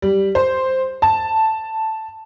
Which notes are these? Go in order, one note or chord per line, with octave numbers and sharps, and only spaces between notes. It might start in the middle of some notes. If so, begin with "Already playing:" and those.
G3
C5
A5